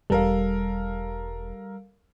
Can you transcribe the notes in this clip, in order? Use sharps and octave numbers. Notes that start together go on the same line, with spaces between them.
E1 G3 A4 A#4 F5